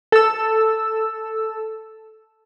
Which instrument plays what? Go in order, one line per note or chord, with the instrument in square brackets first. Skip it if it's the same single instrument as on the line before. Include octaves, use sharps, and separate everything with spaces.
[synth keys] A4 E6